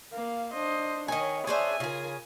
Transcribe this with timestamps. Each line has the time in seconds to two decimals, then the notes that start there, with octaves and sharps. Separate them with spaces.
0.13 A#3 F5
0.54 D4 C5 D#5
1.08 D#3 C#5 D#5 G#5
1.47 D4 G#4 C5 C#5 E5 G#5
1.80 C#3 F4 G#4 A#4